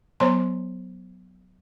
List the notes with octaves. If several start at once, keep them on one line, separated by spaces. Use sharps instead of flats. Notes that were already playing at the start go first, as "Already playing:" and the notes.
F#3 B3 C5 C#5 A#5 C6